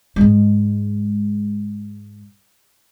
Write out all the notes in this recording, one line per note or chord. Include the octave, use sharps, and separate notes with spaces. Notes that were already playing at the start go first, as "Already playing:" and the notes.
G#2 G#3